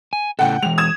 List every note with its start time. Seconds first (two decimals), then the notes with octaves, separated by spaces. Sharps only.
0.13 G#5
0.39 A2 C#3 A4 F#5 G5
0.63 E3 G#3 F7
0.78 D#6 G#6 E7